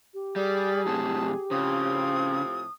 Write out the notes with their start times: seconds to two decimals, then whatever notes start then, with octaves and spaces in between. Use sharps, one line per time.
0.14 G4
0.36 G3 G#4 D5
0.86 F#2 A2 C3 A5
1.51 A2 C#3 F3 C4 D#6